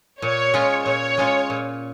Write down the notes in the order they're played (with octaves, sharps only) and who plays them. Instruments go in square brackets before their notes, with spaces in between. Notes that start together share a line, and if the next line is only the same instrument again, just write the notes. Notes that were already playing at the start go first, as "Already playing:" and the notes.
[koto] A#2 [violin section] C#5
[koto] G#3 C#4 F4
[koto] A#2 [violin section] C#5
[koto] G#3 C#4 F4
A#2